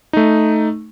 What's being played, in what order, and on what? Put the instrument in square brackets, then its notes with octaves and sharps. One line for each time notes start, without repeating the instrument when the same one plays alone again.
[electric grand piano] A3 D#4